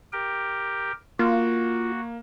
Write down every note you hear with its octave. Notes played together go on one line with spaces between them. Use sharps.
G4 A#4 G5
A#3 F4 F#4